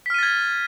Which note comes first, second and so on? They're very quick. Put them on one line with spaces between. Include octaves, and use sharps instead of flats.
B6 F6 D#7 A6 G#6